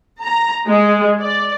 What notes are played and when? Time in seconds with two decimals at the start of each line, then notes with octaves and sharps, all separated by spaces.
0.22 A#5
0.67 G#3
1.20 D5